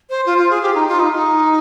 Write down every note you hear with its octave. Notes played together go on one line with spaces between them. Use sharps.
C5
F4
F4
G#4
G4
D#4
F4
D#4
D#4